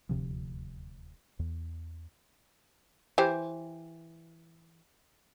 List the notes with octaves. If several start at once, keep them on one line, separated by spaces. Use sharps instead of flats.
D#1 D2 C3 F3
E2
E3 G4 C5